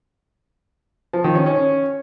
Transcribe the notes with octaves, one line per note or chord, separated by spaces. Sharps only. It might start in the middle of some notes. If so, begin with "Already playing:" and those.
F3
D#3
C#4
C#4